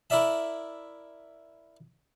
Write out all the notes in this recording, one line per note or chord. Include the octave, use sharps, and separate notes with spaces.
E4 A#4 D5 E5 A5